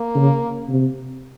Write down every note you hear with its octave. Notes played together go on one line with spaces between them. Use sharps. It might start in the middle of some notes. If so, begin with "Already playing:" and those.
Already playing: A#3
C#3
C3